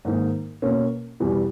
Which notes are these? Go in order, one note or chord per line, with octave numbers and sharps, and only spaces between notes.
G#2 D#3 A#3 D#4
B2 A#3 C#4
E2 B2 G3